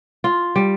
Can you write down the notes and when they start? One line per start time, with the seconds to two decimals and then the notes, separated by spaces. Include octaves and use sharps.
0.24 F4
0.56 G3